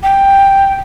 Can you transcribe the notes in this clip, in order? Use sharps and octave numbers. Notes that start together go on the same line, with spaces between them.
G5